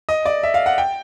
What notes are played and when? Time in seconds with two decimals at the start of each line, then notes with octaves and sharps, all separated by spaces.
0.09 D#5
0.26 D5
0.43 E5
0.54 F5
0.66 F#5
0.78 G5